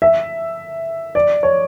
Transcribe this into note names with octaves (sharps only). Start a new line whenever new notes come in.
E5
D5
C#5